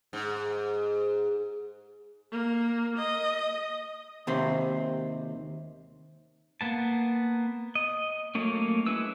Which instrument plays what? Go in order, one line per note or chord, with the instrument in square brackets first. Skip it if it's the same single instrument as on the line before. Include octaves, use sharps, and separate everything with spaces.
[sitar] G#2
[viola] A#3
D#5
[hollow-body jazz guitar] D#2 C3 C4
[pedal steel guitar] A#3 B3 A5
D#5
F#3 A3 A#3 C#4
G#3 C#4 E4 B4 E6